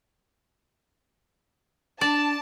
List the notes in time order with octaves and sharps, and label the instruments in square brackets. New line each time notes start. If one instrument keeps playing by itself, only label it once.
[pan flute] D4 [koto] D5 [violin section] A5